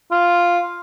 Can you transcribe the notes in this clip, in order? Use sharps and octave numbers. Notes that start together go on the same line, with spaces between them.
F4